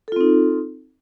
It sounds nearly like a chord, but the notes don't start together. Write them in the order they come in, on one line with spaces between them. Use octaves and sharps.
A4 F4 C4 D#4